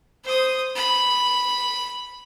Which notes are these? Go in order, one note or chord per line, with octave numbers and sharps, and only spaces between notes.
C5 D#6
B5